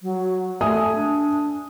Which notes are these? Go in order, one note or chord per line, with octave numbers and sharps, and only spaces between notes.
F#3
A3 E5 G#5 D#6
D4